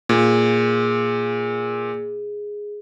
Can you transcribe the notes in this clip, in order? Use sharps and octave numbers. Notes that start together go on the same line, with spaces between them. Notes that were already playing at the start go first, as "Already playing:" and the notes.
A#2 G#4